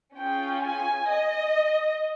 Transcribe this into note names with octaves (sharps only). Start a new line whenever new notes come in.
C#4 F4 G#4 G5
G#5
D#5